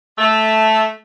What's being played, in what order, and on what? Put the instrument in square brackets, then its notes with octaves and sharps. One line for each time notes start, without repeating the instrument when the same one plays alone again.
[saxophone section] A3